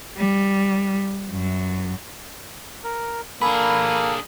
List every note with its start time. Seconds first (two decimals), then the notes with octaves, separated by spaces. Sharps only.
0.17 G3
1.30 F#2
2.84 A#4
3.42 A#3 D4 G#4 A4 B5